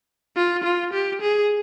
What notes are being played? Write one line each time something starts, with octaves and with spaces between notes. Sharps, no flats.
F4
F4
G4
G#4